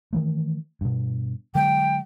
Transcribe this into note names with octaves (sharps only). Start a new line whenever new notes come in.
D#3 E3 A3
G2 B2
D3 F#3 G#3 G5